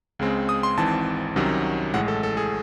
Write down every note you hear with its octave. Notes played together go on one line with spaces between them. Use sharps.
C#2 C#3 G#3 C4
D#6
C6
G#1 G#2 E3 C4 A5
C2 C3 D#3 F#3 C#4
A1 A2 G#3 F#5
A4
A4
G#4